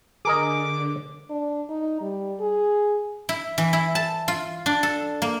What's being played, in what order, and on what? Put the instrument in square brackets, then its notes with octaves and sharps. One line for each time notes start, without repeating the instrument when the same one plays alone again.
[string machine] D3 [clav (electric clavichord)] G#4 A#4 D#5 [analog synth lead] D6
[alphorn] D4
D#4
G3
G#4
[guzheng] E4
E3
E4
A5
F4
D4
A4
A#3